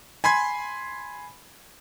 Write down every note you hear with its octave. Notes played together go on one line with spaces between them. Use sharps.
G#5 B5 C6 G#6